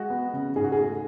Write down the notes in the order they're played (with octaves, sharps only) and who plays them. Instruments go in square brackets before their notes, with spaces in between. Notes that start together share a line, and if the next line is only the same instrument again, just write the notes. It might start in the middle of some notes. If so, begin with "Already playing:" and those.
Already playing: [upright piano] G#3 F#4
B3
C#3
G#2 G#4
F#4
G#4
A3